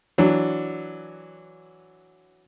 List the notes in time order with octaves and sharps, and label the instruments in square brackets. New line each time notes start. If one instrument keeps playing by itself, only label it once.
[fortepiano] E3 F#3 D4